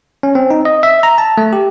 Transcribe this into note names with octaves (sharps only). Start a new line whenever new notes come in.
C#4
C4
D#4
D#5
E5
A#5
A5
A3
G4